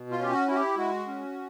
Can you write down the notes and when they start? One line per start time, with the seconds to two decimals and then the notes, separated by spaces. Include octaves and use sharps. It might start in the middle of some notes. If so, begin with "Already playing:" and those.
Already playing: B2
0.11 F4
0.19 C#4 G4
0.33 F#4
0.48 E4 F#4
0.56 G4
0.77 G#3 F#4
1.07 C#4